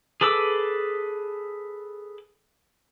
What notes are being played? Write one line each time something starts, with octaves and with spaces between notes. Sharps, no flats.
G#4 A4 B4 D6 E6